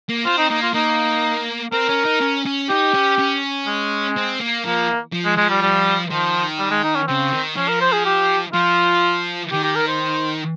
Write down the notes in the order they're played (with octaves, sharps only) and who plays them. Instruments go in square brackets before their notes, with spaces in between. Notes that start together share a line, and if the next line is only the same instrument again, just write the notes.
[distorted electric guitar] A#3
[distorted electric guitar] C4 [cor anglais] F4
[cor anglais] D#4
[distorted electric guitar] A#3 [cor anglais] D#4
[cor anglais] F4
[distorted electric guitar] A#3 [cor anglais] D#4
[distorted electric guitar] C4 [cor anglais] A#4
[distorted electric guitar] C#4
D#4
C#4
C#4
[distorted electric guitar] D#4 [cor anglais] G4
[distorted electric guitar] C#4
C#4
[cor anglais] G#3
[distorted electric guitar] C4
A#3
[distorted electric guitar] F3 [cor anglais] A#3
[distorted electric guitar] F3
[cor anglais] G#3
[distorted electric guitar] F3 [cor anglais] G#3
[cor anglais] G3
G3
[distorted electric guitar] D#3 [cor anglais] F3
[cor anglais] G3
G#3
D#4
C#4
[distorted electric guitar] C#3 [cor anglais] C4
[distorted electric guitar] D#3
[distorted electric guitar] F3 [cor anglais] C#4
[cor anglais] A#4
C5
G#4
G4
[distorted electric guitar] F3 [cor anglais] F4
[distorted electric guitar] D#3 [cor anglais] G4
[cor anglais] G4
A#4
C5